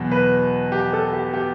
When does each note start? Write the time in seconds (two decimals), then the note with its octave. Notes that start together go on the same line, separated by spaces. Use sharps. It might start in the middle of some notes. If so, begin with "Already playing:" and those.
Already playing: E2 B2 F#3
0.11 B4
0.72 G4
0.93 A4
1.13 G4
1.33 G4